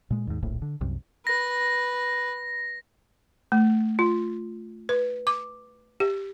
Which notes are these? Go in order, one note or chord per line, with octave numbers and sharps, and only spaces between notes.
A#2 G#3
D#2 G#2
D1 A#1 A2
D3
C2 F#2
B4 A#6
A3
F4
B4
D6
G4